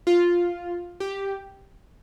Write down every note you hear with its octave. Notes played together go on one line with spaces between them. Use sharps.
F4
G4